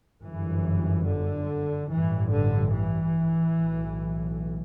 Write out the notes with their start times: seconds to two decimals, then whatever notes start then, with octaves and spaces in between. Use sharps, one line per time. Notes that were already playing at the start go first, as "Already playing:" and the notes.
0.23 G1 F#2 E3
1.06 D3
1.89 A1 G2 E3
2.31 D3
2.72 E3
3.55 B1 A2